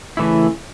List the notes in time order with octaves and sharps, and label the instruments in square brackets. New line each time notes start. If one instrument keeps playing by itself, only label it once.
[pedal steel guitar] C#3 E3 A3 E4